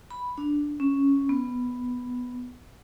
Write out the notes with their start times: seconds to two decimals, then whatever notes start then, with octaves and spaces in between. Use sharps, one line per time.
0.11 B5
0.38 D4
0.80 C#4
1.29 B3